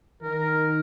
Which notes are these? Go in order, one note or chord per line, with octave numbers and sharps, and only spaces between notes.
D#3 A#4